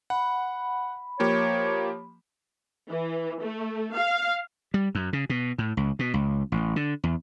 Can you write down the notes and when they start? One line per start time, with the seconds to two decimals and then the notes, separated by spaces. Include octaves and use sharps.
0.10 F#5 B5
1.20 F3 A#3 G4 C#5
2.88 E3
3.41 A3
3.94 F5
4.74 G3
4.95 F#2
5.13 C#3
5.30 B2
5.58 A2
5.77 C#2
5.99 B2
6.14 C#2
6.52 A1
6.76 D3
7.03 E2